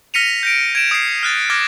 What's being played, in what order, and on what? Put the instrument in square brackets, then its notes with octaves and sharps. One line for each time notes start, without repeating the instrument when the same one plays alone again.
[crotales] F6 A#6 B6 C#7 D#7 F7
G6 A#6 D7
G#6 D7 E7
D#6 C7
F6 F#6 A6
D6 F6 G#6 A#6